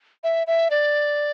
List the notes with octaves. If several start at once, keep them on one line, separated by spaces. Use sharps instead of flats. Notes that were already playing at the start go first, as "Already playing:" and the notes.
E5
E5
D5